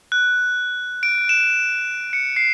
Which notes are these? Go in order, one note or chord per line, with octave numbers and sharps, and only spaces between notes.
F#6
D7
E7
C#7
C7